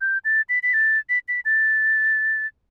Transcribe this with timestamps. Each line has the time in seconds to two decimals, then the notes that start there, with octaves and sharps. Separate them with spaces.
0.01 G6
0.25 A6
0.49 B6
0.63 B6
0.73 A6
1.09 B6
1.28 B6
1.45 A6